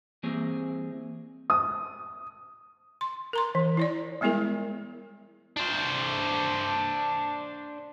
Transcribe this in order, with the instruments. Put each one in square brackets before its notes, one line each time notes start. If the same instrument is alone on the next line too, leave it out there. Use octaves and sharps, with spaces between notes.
[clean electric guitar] E3 G3 A#3 C4 G#4 C#5
[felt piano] D#6
[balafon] C6
A#4 A#5 C6
E3
E4 C#5 D5
G3 G#3 B3 E4 G#4 A#4
[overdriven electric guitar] D4 C5